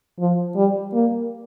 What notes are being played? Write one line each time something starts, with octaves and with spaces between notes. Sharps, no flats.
F3
G3
A#3